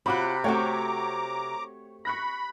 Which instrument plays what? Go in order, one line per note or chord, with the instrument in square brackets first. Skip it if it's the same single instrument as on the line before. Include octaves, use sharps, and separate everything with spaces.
[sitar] C3 [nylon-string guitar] F4 F#4 C#5 [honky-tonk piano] B5 D6 F#6
[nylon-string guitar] A3 C4 F#4 [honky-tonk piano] C#5 G5 C#6 [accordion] A#5 D6
[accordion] B5 [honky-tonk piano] C#6 F#6 A#6